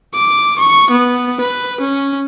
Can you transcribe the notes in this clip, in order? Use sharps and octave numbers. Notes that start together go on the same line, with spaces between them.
D6
C#6
B3
B4
C#4